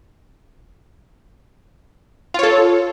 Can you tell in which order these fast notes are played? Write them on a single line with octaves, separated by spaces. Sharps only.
F4 C#5 A4